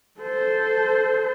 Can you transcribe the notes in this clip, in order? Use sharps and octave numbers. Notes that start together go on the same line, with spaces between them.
A4 C5